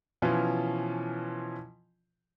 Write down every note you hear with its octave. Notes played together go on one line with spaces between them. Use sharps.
B2 E3 F3 C#4 F4